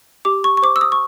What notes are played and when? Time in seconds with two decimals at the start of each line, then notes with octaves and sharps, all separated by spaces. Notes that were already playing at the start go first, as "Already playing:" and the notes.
0.25 G4 D6
0.44 C#6
0.57 C#6
0.62 C5 D6
0.76 E6
0.81 D#6
0.92 C#6